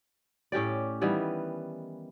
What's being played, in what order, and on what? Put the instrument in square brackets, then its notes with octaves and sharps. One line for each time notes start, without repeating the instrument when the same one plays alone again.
[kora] A2 C#4 G4 D5
D#3 E3 G3 B3